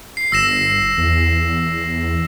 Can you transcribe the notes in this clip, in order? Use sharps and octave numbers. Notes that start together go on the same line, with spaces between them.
C7
G1 E6 A#6 E7
E2